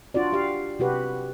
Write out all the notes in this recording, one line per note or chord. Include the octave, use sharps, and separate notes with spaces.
D4 F4 F#4 D5
G4 F5
C3 F#4 G4 B4